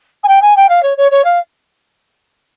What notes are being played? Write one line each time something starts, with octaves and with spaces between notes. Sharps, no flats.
G#5
G5
G#5
G5
F5
C#5
C#5
C#5
F5